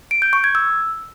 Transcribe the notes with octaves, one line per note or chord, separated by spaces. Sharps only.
D7
G6
C#6
G#6
E6